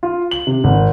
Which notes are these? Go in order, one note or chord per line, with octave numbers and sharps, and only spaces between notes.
F4
F#7
C3
G#1